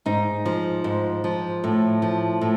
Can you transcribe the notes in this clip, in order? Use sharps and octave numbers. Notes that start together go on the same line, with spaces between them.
G#2 D#4
F3
G#2
F3
A2
F3
A2